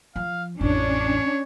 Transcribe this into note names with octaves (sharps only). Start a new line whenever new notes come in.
F3 F5
A1 F2 C#4 D4 C#5